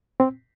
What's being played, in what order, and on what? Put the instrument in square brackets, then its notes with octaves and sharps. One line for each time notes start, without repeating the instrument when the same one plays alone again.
[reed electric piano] C4